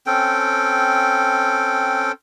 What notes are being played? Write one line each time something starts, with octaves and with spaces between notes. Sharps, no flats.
C4 C#4 A4 G5